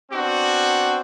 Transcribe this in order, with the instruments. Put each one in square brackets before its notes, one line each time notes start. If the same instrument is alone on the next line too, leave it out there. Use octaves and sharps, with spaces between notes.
[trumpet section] B3 C4 D4 F#4